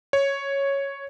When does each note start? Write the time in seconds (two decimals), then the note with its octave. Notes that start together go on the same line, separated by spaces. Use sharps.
0.13 C#5